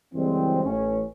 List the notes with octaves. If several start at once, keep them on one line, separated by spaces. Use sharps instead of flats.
F#1 E3 G3 G#3 C4
A1 C#4